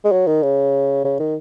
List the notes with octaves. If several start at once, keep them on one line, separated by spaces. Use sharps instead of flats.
G#3
F#3
D#3
C#3
C#3
D#3